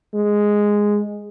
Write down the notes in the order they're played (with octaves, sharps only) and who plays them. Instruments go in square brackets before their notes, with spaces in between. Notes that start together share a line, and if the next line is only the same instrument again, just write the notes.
[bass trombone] G#3